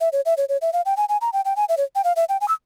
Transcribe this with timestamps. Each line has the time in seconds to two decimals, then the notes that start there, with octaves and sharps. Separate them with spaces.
0.01 E5
0.13 C#5
0.26 E5
0.37 C#5
0.49 C#5
0.62 E5
0.73 F5
0.86 G5
0.97 G#5
1.09 G#5
1.21 A#5
1.33 G5
1.45 G5
1.56 G#5
1.69 E5
1.77 C#5
1.95 G5
2.04 F5
2.16 E5
2.29 G5
2.41 G#5
2.48 E6